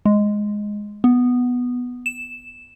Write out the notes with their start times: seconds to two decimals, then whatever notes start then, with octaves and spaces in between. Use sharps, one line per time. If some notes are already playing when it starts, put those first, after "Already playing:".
0.06 G#3
1.04 B3
2.06 E7